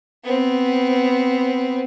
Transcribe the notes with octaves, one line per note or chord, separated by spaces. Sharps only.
B3 C4